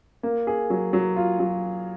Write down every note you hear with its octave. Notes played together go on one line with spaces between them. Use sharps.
A#3
G#4
F#3
F#3
F4
F#3